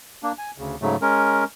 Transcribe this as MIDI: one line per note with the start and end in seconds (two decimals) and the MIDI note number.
0.23 0.32 58
0.23 0.32 62
0.38 0.51 80
0.58 0.76 38
0.58 0.76 49
0.82 0.96 44
0.82 0.96 49
0.82 0.96 54
0.82 0.96 57
1.02 1.44 56
1.02 1.44 61
1.02 1.44 70